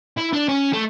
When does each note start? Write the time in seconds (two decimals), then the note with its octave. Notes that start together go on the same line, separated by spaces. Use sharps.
0.17 E4
0.33 D4
0.49 C#4
0.73 A3